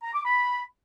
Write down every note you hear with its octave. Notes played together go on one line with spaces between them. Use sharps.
A#5
D6
B5